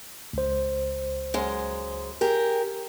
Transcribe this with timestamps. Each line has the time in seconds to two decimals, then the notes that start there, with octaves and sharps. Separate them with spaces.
0.33 C#2 C5
1.34 F#2 G#3
2.21 G4 G#4 A#4